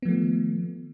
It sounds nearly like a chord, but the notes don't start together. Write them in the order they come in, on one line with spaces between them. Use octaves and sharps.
B3 F3 A3 D#3